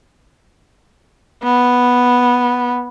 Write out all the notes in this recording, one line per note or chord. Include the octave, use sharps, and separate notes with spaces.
B3